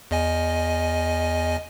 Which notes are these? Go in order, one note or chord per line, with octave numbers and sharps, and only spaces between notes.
E2 D#5 G#5